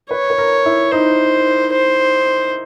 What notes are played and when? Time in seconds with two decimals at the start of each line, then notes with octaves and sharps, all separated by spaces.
0.11 B4 C#5
0.30 B4
0.38 A#4
0.65 E4
0.91 D#4 C5
1.73 C5